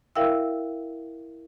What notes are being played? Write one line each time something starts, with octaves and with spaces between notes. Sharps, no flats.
E4 A#4 E5 F5 G5 E6